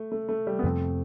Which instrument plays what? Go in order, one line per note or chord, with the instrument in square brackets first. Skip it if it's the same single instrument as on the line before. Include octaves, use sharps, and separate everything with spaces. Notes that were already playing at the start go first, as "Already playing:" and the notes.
Already playing: [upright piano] A3
A3
A3
G3
B3
[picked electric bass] F2 C3 F3 C4 [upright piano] A3